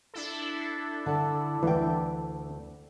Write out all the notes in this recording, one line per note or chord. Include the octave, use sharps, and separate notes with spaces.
D4 E4 A4
D3
D2 E3 G5